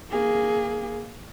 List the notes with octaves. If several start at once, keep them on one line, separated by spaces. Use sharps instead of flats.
A#3 G#4